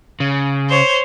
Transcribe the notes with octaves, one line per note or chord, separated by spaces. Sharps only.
C#3
C5 C#5